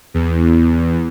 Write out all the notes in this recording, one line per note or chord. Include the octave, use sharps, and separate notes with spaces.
E2